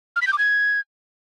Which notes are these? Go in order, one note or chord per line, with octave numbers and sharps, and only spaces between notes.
F6
B6
G6
D6
G#6